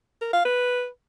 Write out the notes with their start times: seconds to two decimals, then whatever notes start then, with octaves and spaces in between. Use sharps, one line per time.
0.21 A#4
0.33 F5
0.45 B4